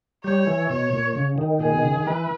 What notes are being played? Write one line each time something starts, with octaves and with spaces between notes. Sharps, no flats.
G3 C#5
E3
B2 C#5
A#2
C#3
D#3
A#2 G#4
B2
C#3
D#3
E3 B4